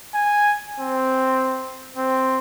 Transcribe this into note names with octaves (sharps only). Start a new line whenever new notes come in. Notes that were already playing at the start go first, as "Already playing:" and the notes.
G#5
C4
C4